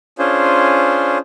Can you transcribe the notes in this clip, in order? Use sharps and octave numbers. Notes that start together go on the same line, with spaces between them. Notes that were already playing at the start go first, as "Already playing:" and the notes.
C#4 D4 F4 G#4 C5